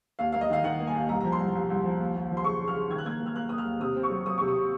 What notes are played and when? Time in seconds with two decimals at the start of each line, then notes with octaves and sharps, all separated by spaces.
0.19 D#2 F5
0.32 A#3 F5
0.41 D#5
0.50 D#3 F5
0.64 D#3 F#5
0.80 A#3
0.87 G#5
0.95 D#2
1.09 C2 A#5
1.21 F3 A#5
1.32 C6
1.39 C2
1.55 C2
1.70 C2
1.85 F3
2.00 D#2
2.15 D#2
2.30 F3
2.37 C6
2.44 C#3 C#6
2.61 C#3
2.68 F6
2.75 C#3
2.90 D#3 G#6
2.98 F#6
3.05 A#3 G#6
3.20 A#3
3.26 F6
3.36 A#3 F#6
3.49 A#3 D#6
3.58 F6
3.65 D#2
3.80 C3 D#6
3.96 C4
4.03 C#6
4.10 F#3
4.25 F#3 D#6
4.38 C3 C#6
4.48 D#6
4.55 C4